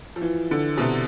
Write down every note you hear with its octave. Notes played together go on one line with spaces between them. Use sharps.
F3
E3
D3
B2
C3